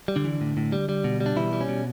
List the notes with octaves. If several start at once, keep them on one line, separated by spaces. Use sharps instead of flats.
G3
D3 D4
E3
A2
A2
G3
G3
B2
G3
D4
B2 E3 E4
G3
C#4
B2